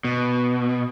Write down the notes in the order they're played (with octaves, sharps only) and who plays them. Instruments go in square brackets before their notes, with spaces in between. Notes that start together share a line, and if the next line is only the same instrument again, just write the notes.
[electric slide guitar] B2